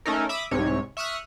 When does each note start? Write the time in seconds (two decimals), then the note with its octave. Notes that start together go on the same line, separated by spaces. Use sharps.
0.06 A3 C#4 D#4 A4 A#4
0.29 E5 B5 D6 D#6
0.51 C2 G#2 C3 C#5
0.97 E5 C#6 D#6 F6 F#6